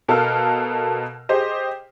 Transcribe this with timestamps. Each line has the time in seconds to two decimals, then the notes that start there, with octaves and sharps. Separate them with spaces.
0.08 B2 A4 A#4 F5 E6 F6
1.29 G4 G#4 C5 D#5